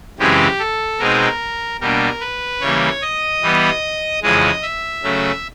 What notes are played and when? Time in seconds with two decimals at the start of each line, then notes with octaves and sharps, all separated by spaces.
0.19 F#2 C#3 E3 G#3 C4 G4
0.59 A4
0.99 B2 G#3 C4 D#4 A#4
1.81 B2 G3 A#3 D4 A#4
2.21 B4
2.61 C#3 E3 G3 A#3 C#5
3.01 D#5
3.42 E3 G3 B3
4.22 F2 C#3 E3 G#3 D#5
4.62 E5
5.03 C#3 F#3 A3 C#4